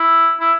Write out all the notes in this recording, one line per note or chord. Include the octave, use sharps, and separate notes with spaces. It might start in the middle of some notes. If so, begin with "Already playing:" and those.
Already playing: E4
E4